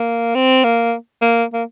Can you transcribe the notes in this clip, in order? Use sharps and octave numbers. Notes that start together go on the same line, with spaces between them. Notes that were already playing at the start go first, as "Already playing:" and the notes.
Already playing: A#3
C4
A#3
A#3
A#3